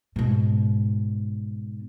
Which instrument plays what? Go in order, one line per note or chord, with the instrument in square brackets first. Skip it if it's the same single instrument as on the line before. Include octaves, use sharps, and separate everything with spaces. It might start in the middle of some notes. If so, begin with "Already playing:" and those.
[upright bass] G#2 B2